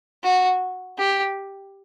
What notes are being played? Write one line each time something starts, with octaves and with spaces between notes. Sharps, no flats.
F#4
G4